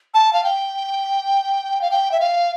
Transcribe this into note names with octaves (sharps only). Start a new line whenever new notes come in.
A5
F5
G5
F5
G5
E5
F5